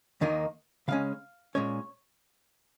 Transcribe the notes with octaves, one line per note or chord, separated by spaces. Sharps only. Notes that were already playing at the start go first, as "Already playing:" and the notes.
D#2 D#3 A#3 D#4
C#3 G#3 C#4 F5
A#2 G#3 C#4 C#5